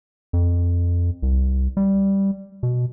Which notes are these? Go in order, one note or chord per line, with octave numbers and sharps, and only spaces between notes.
F2
C2
G3
B2